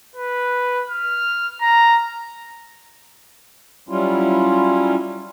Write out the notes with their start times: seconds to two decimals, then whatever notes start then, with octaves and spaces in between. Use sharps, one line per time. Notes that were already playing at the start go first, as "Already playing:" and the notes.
0.16 B4
0.89 F6
1.62 A#5
3.89 F#3 G3 C#4 E4 F4